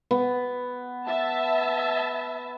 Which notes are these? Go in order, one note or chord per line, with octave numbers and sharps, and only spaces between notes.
B3
E5 A5